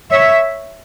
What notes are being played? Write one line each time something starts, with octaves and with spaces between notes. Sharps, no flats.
C#5 E5